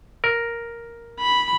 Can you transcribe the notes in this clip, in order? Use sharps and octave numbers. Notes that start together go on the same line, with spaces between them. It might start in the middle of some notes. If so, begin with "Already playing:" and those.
A#4
B5